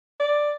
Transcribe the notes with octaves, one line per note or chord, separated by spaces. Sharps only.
D5